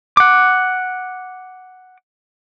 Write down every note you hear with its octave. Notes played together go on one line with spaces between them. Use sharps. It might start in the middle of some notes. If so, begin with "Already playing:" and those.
F#5 D6